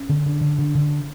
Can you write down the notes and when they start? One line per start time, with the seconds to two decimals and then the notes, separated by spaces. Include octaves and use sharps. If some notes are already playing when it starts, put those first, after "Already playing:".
Already playing: C#4
0.09 D3
0.26 D3
0.41 D3
0.58 D3
0.75 D3